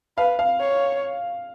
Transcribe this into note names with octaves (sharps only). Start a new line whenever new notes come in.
B4 F5
F5
C#5